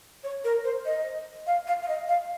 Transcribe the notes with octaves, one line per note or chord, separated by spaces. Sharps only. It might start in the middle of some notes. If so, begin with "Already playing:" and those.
C#5
A#4
C5
D#5
F5
F5
F5
D#5
F5